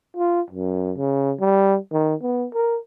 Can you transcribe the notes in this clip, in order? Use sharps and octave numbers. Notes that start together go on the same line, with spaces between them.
F4
F#2
C#3
G3
D#3
B3
A#4